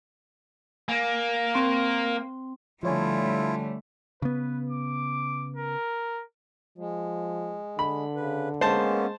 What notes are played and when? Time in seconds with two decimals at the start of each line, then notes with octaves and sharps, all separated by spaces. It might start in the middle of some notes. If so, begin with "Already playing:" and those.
0.88 A#3 G#5
1.55 C4 C6
2.83 D3 F3 G3 A3 E4 F4 C#5 G#5
4.22 C#3 B3 B4
4.70 D6
5.57 A#4
6.78 F3 G#3
7.79 D3 B5
8.16 C#3 B4
8.61 G#3 A#3 B3 C#4 C5 A5